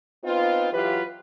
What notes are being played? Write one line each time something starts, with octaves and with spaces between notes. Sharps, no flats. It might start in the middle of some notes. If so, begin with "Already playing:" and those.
B3 C4 D#4 F4
E3 F#3 F4 G4 B4